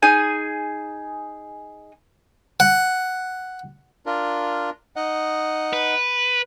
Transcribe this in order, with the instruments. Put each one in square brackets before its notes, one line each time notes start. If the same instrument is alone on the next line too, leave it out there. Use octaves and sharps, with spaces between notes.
[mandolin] D#4 G#4 G#5
[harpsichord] F#5
[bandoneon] D4 F4 A#4
D#4 D#5 F#5
[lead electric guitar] B4